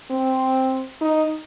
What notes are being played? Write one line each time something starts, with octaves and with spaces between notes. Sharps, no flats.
C4
D#4